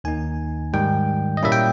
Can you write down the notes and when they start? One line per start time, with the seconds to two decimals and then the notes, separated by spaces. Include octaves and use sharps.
0.04 D#2 D#3 A#3 D#4 G#5
0.73 G#2 D#3 G3 G5
1.37 D#5
1.43 A#2 G3 A#3 C#4 E4 E5
1.52 G5